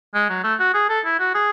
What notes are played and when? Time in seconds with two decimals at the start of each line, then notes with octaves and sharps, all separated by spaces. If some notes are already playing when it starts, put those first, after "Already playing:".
0.14 G#3
0.29 F#3
0.44 A3
0.59 F#4
0.74 G#4
0.89 A4
1.05 E4
1.19 F#4
1.34 G#4